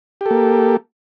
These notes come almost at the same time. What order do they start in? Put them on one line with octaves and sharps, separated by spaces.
G4 A4 A#3